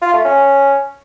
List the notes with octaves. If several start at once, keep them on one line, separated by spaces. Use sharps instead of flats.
F4
A3
C#4